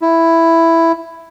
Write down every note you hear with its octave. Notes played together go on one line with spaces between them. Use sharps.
E4